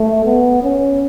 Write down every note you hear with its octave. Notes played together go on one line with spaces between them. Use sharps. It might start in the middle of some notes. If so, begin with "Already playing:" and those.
Already playing: A3
B3
C#4